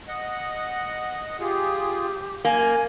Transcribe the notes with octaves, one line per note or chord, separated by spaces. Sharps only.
D#5 F#5
F4 G4 G#4
F#2 A#3 G#5